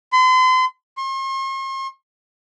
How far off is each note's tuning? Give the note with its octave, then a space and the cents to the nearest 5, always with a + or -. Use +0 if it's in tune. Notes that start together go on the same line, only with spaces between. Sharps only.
C6 -40
C6 +45